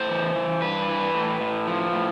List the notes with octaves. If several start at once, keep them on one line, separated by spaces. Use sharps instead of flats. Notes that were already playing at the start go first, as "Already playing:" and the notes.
Already playing: A2 C5
E3
E3
G2 B4
E3
A2
A2
F3
A2